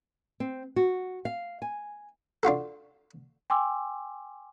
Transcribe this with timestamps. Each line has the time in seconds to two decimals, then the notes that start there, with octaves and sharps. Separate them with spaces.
0.40 C4
0.76 F#4
1.25 F5
1.62 G#5
2.43 D4 F4 F#4 A4
3.50 G5 G#5 C6 D6 E6